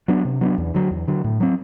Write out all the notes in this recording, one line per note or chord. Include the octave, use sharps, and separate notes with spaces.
F#3 B3 D4
C3
F#3 B3 D4
E2
D3 F#3
E2
D3 F#3
A2
F#3 C4